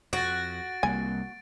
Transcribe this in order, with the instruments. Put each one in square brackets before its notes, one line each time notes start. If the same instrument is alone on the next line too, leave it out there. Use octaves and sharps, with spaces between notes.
[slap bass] F2 [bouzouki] F#4 [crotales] A6 D7
[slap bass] C2 A#3 [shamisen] G#5